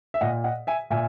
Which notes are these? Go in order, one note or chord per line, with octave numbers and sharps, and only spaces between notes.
E5
A#2 D#5 F#5
D#5 F#5
E5 G#5
A#2 E5 G#5